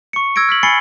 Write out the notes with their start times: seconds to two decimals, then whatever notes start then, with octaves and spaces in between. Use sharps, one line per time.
0.13 C#6 C#7
0.36 E6 G#6 A#6 D7
0.49 F6 B6 F#7
0.63 G#5 B5 A6 C7 C#7 G7